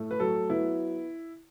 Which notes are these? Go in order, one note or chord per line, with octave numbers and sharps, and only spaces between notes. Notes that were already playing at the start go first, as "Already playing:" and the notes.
Already playing: A2 A3
B4
F#3 A4
B3 E4